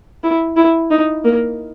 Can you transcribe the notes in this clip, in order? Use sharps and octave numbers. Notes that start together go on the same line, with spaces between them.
E4
E4
D#4
A#3